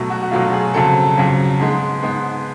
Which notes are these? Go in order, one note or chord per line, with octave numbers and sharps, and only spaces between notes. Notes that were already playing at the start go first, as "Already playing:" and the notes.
Already playing: B2 F#3 A3
F#4
F#4
B2 F#3 A3 F4
G#4
F2 C#3 F#3 A4
F2 C#3 F#3
G#2 G#3 B3
G#2 G#3 B3